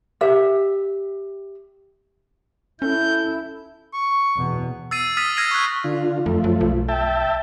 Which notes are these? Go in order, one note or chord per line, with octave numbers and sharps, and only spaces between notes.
G4 E5
C#4 E4 A4 G6
C#6
E2 B2
E6 A6 C7 D#7
D#6 F6 A6 B6 D#7
E6 F6 G#6 A#6 C7 D#7
C#6 F#6
D3 F4
F2 F3 A3
F#2
B1
E5 G5 A5